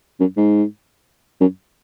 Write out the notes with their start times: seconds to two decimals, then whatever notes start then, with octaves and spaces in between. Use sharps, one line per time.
0.20 F#2
0.37 G#2
1.40 F#2